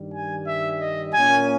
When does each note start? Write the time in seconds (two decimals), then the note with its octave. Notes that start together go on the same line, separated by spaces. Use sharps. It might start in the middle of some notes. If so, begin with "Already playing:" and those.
Already playing: G2 D#3 G3
0.13 G#5
0.47 E5
0.80 D#5
1.14 A#2 A#3 C#4 G#5